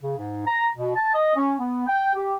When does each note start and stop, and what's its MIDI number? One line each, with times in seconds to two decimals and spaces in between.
0.02 0.13 49
0.17 0.41 44
0.45 0.65 82
0.75 0.95 47
0.95 1.10 81
1.13 1.33 75
1.35 1.53 61
1.58 1.87 59
1.87 2.10 79
2.14 2.34 67